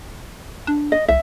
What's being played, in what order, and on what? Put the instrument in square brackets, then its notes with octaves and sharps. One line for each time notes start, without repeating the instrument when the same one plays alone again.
[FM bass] D4
[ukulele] D#5
[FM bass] C2 [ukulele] E5